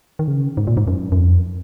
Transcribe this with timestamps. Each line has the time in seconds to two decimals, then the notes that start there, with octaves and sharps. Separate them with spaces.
0.19 D#3
0.28 C#3
0.57 G#2
0.67 A#2
0.77 G#2
0.88 F#2
1.12 F#2
1.17 F2